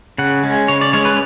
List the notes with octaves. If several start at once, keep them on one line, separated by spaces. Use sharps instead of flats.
C#3 F#5
G#3 C#4
C#3 C#5
D5
G#3 C#4 C#5
B4